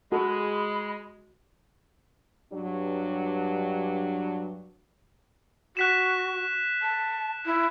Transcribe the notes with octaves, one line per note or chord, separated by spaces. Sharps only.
G#3 F#4 A4 B5
G2 F#3 D4
F#4 F#6 B6 E7
A5
E4